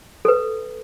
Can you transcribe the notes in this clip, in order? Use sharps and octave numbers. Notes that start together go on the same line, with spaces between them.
A4 B4